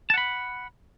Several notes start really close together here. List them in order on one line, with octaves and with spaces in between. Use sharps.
A5 F#5 B5